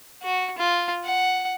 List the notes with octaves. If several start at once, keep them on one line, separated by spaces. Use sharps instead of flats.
F#4
F4
F#5